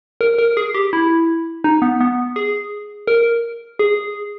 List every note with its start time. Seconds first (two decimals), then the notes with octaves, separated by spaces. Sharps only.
0.21 A#4
0.38 A#4
0.57 G#4
0.74 G4
0.93 E4
1.64 D#4
1.82 B3
2.00 B3
2.36 G#4
3.07 A#4
3.79 G#4